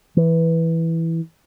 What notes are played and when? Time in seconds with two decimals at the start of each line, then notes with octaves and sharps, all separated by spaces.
0.17 E3